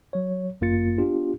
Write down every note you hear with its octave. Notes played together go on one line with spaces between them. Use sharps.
F#3 C#5
G1 F#2 A#3 F4 A6 C#7
B3 D4 F4 G4